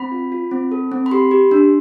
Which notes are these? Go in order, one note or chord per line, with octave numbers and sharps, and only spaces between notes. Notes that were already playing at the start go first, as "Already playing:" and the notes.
Already playing: C4 B5
F4
F4
C4
A4
C4
B5
G4 C6
G4
D4